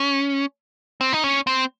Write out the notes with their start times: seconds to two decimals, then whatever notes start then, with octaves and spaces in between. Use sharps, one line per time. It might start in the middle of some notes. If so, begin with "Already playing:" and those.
Already playing: C#4
1.01 C4
1.13 D#4
1.24 C#4
1.47 C4